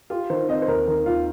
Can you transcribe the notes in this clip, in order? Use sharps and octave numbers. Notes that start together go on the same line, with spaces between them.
F4 G4
D#3 C5
C4 D#5
C5
D#2 A#4
D#3 A#4
D#2 F4